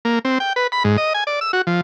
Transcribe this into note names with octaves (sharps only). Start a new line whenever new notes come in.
A#3
C4
G5
B4
B5
G#2
D#5
G#5
D5
E6
F#4
F3